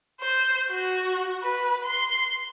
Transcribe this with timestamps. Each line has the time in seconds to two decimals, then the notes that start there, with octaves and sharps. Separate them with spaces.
0.21 C5
0.71 F#4
1.43 B4
1.84 C6